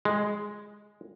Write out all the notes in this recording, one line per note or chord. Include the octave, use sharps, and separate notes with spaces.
G#3